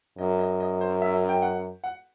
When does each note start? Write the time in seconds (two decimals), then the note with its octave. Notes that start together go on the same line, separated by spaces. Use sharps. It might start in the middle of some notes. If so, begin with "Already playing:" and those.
0.18 F#2 D#5
0.39 D#5
0.60 D#5
0.81 C5
1.02 E5
1.29 G5
1.42 F#5
1.84 F#5